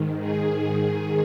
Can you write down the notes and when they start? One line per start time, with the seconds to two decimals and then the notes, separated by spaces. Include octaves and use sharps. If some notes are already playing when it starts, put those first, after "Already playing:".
Already playing: G#2 D#3
0.20 G#4